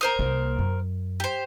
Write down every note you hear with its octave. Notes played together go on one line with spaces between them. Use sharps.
A#4 C5 D#6
C2 A#3
F#2
G4 C5